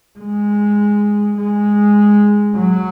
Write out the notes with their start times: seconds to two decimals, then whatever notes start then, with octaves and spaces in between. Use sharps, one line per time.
0.19 G#3
1.37 G#3
2.55 F#3